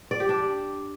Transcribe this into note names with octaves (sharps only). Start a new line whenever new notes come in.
D5
G4
D4